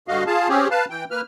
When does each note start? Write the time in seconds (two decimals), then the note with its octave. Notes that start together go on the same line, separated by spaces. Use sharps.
0.08 G2 D3 F#4 D#5 F5
0.27 F4 G#4 F5 A5
0.49 C4 C#4 G4 G#4
0.71 B4 F5 A5
0.90 E3 G5
1.11 A#3 B4 F6